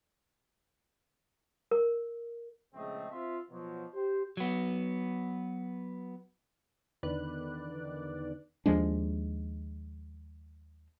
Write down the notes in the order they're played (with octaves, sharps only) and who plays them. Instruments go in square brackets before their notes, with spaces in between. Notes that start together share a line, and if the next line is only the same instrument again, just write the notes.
[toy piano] A#4
[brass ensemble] A#1 C#3 G#3 A3 C4 D#5
C4 F4 E5
B2 F3 F#3
G4 C5
[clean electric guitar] F#3 B3
[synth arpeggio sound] E2 D3 D#3 B4 D5 F#6
[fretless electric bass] D#2 F3 G#3 D4